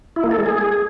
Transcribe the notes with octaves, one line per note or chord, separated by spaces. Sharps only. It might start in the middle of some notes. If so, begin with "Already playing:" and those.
E4
A#3
A4
G#3
G#4